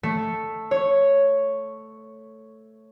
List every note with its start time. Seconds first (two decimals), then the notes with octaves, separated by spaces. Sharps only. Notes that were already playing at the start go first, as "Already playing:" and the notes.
0.03 A3
0.71 C#5